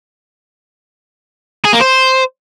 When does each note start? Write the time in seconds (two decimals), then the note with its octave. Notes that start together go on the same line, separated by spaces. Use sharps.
1.65 G#4
1.73 A#3
1.81 C5